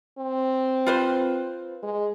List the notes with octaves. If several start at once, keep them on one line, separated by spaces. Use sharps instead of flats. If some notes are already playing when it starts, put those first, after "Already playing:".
C4
F4 B4 C5
G#3